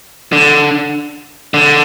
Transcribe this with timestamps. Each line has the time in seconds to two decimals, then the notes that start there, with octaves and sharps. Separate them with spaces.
0.33 D3
1.54 D3